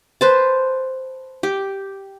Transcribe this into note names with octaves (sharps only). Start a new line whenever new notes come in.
B4 C5 A5
G4